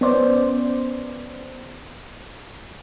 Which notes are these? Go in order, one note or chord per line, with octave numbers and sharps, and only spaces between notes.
B3 C#4 C5 D5